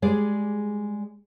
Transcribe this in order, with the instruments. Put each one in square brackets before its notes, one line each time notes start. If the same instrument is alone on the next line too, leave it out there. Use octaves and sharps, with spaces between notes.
[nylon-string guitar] G3 G#3 G#4 D5